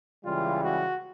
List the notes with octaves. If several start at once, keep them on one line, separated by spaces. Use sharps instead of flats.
C#2 C#3 E3 G3 F4
F#4